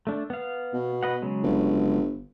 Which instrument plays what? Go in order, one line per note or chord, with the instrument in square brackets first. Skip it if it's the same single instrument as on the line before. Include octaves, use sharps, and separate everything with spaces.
[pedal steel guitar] A3 D4
B3 F5
[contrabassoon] B2
[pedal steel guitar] B4 D#5 F#5
C#3 F#3 G#3
[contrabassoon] G1